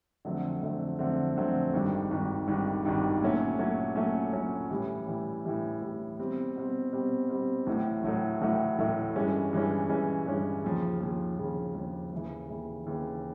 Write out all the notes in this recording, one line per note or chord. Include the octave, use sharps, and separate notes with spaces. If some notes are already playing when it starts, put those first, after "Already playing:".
F2 D3 F#3 A3 C4
F2 D3 F#3 A3 C4
F2 D3 F#3 A3 C4
F2 D3 F#3 A3 C4
G#1 G2 D#3
G#1 G2 D#3
G#1 G2 D#3
G#1 G2 D#3
A#2 F#3 A3 C#4
A#2 F#3 A3 C#4
A#2 F#3 A3 C#4
A#2 F#3 A3 C#4
A2 E3 G3
A2 E3 G3
A2 E3 G3
A2 E3 G3
B2 G3 C4
B2 G3 C4
B2 G3 C4
B2 G3 C4
A1 A2 F#3 A3
A1 A2 F#3 A3
A1 A2 F#3 A3
A1 A2 F#3 A3
G2 E3 G#3 C#4
G2 E3 G#3 C#4
G2 E3 G#3 C#4
G2 E3 G#3 C#4
D#2 C#3 F3
D#2 C#3 F3
D#2 C#3 F3
D#2 C#3 F3
D#2 C#3 E3
D#2 C#3 E3
D#2 C#3 E3